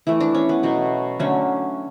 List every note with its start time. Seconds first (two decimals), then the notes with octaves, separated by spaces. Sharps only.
0.07 E3 A3 E4
0.21 D4
0.35 C#4
0.49 B3
0.63 B2 F#3 A3
1.19 D3 F#3 A3 C#4